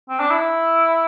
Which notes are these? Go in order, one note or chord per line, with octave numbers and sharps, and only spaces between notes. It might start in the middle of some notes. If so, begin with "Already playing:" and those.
C4
D4
E4